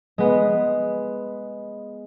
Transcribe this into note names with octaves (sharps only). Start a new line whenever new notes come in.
G#3 B3